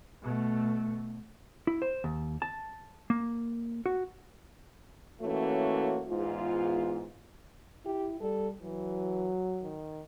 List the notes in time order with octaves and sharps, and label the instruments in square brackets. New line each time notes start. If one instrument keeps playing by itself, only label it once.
[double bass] B2 A3
[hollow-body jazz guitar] E4
C5
D#2
A5
A#3
F#4
[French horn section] E3 A3 A#3 C#4 F#4 C#5
E2 G#2 F4
[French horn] E4 [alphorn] G4
[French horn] G3 [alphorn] A4
[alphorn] E3 [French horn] F#3
[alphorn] D#3